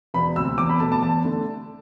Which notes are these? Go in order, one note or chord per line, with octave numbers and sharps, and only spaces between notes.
E1 B5
D2 C3 E6
E2 D6
B5
B2 A3 A5
A5
E2 A5
D3 A3